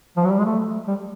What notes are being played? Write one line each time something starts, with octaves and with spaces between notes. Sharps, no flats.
F3
F#3
G3
G#3
A3
G3